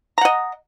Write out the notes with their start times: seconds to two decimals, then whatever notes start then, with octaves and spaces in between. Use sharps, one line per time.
0.18 A#5
0.21 F#5
0.25 D#5